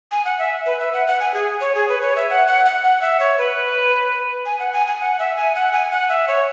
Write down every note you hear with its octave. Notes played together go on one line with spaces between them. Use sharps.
G#5
F#5
E5
B4
E5
F#5
F#5
G#5
G#4
C#5
G#4
B4
C#5
E5
F#5
F#5
F#5
F#5
E5
C#5
B4
G#5
F#5
G#5
G#5
F#5
E5
G#5
F#5
G#5
F#5
E5
C#5